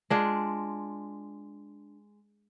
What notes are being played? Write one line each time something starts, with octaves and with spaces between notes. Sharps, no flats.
G#3 D4 F4